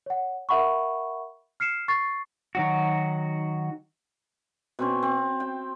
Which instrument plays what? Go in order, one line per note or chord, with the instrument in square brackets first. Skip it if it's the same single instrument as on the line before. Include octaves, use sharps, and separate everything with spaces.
[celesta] C#5 F#5
A#4 E5 F#5 B5 C#6
F6 C7 C#7 E7
C#6 A6 C7
[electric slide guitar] D#3 F#3 F#4
[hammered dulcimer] B2 C4 C#4
C4
G5